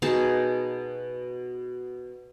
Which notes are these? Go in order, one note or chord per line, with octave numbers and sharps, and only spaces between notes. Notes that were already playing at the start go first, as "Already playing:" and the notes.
B2 D#4 G#4 A5